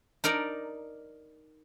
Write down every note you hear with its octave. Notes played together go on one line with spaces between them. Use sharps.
D#4 A#4 D5 A#5